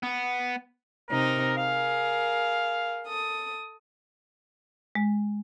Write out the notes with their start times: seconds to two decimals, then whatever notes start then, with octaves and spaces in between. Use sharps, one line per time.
0.03 B3
1.10 C3 C4 D#4 A#4
1.58 G#4 A#4 F5
3.07 A4 D#6
4.95 G#3